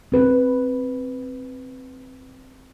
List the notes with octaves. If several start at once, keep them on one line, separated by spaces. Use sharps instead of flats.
C4 B4